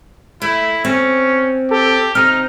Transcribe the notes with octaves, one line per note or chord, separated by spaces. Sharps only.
A3 E4
C4 C#4
G4 A4
C3 C4 D#4 F6